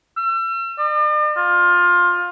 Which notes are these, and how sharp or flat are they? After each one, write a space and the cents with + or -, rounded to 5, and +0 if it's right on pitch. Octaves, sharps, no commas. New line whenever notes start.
E6 +40
D5 +45
F4 +20